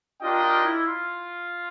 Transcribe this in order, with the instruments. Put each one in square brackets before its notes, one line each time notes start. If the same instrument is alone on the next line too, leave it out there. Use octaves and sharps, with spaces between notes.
[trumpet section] D4 G4 A#4 D#5 G5 [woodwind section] F4
[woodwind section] F4
E4
F4